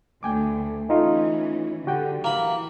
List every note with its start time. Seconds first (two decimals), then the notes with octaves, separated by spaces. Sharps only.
0.23 D2 A3 G5 G#5 D6
0.89 E3 A3 C#4 D#4 F4
1.87 D3 F#4 G4 G5
2.24 E3 A#3 B5